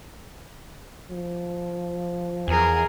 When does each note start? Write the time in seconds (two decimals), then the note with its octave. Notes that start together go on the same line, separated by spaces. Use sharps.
1.11 F3
2.48 E2 G#4 A#4